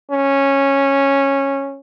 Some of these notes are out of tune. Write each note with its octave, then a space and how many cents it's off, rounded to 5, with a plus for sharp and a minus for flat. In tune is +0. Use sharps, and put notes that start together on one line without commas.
C#4 -10